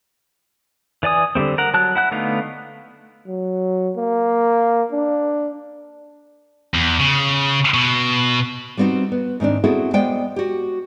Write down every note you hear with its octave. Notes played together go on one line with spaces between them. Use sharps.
E3 D5 G#5 D#6
D3 G3 A3 C4
A#4 F#5
F#3 A5 F#6
E4 F#5 F#6
D3 A3 B3 D#4 F5
F#3
A#3
D4
E2
C#3
B2
G3 B3 C4 D#4 F#4
B3
G#2 D#3 C4 D4
B3 C4 E4 F#4 G#4 A4
G#3 B3 C5 D5 F#5 G5
F#4 G4